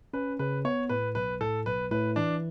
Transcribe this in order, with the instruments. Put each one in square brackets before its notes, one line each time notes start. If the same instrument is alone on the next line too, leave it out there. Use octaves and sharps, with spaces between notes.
[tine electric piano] C#4 [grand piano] B4
[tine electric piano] C#3 [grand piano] B4
[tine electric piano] B3 [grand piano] C#5
[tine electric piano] A2 [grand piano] B4
[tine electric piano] B1 [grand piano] B4
[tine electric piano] A2 [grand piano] A4
[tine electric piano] B1 [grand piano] B4
[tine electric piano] A2 [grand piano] B4
[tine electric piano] E3 [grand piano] D4